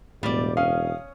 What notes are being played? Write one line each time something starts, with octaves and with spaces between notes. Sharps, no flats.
E1 A2 G3 B3 D5
C#4 F5 D#6